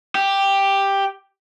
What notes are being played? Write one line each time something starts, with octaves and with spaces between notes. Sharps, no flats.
G4